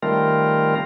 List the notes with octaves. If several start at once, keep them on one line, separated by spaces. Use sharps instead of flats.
D#3 G3 A3 C4 F4 A#4